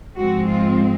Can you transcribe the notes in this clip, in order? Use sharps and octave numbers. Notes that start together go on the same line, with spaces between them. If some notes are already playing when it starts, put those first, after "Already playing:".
G#2 F3 G#3 C4 F#4
F4